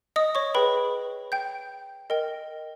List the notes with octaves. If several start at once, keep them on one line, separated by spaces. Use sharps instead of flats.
D#5 D#6
C#5 C#6
G#4 B4 G5 B5
G5 G6
A#4 D#5 G5